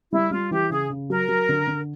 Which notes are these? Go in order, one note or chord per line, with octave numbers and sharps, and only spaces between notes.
G3 E4
G3 F4
E3 G4
C#3 G#4
C#3
F#3 A#4
F#3
D3
D3